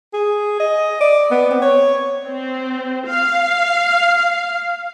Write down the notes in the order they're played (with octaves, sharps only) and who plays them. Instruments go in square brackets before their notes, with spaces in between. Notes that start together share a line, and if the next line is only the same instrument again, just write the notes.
[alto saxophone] G#4
D#5
D5
B3
C4
C#5
[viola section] C4
F5